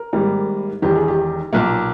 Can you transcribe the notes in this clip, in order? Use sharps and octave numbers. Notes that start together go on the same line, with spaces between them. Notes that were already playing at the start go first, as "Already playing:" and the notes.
Already playing: A#4
G#1 G#2 G3 A#3
E1 E2 D#3 G4
G#4
G4
B1 A#2 A#3